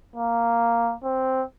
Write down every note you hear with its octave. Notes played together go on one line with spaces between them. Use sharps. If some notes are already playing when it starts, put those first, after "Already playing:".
A#3
C4